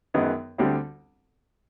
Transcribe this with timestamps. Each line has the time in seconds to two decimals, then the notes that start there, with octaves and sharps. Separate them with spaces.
0.14 F#2 D#3 G#3 B3
0.58 D2 D3 G3 C4 E4